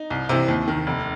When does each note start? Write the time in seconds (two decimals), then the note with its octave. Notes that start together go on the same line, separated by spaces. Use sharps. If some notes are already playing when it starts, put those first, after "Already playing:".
Already playing: D#4
0.10 C2
0.29 C3 E3
0.48 D#2
0.68 D#3
0.87 F1